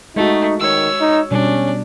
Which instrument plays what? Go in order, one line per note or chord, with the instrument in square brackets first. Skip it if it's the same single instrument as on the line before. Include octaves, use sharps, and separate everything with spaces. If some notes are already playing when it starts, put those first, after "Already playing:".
[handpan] G#3 F#4 [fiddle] A3 [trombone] D#4
[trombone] D#3 [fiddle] C#5 E6
[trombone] D#4
[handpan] B2 G3 [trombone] C#4 [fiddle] D4